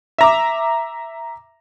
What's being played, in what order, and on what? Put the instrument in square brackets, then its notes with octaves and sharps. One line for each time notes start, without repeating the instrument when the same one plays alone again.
[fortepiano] E5 A#5 D6